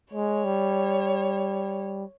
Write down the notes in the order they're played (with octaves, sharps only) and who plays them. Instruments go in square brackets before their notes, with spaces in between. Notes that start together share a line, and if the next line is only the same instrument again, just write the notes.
[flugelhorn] G#3 [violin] C#5
[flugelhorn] G3